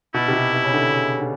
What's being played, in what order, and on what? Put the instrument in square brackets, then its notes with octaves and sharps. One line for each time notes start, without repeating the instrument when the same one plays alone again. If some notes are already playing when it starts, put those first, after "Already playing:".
[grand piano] B2 [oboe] E4
[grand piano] C3
B2
C3
C#3
D3
C#3
D3